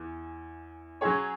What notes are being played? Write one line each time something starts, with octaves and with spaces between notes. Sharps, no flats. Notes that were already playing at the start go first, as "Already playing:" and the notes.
Already playing: E2 E3
F#3 C#4 G#4 C#5